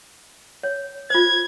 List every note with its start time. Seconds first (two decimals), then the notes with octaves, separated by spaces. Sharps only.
0.63 C#5
1.10 F4 C5 G#6